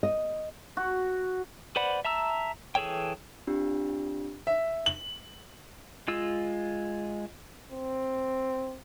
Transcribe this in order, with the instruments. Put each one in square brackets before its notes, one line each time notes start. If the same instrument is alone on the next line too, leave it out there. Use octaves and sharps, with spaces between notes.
[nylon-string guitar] D#5
[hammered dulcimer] F#4
[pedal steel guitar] B4 C5 D5 F#5 B5
E5 A5 A#5 E6
E3 G#4 A4 C#5 G5
[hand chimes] C4 D4 F4 G4
[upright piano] E5
F#7
[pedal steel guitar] G#3 F4 E6
[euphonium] C4